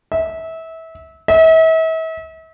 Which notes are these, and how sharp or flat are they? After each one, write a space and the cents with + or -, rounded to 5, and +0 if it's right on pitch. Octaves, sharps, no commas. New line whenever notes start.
E5 -25
E5 -40